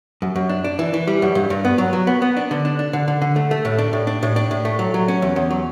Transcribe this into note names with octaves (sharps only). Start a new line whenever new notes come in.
F#2
F#2
D4
D4
E3
E3
G3
F#2
G2
G2
B3
F#3
F#3
B3
B3
D4
D3
D4
D4
D3
D3
D3
A3
A3
A2
D4
A2
D4
A2
D4
A2
A3
F#3
F#3
C#4
E2
E2
F#3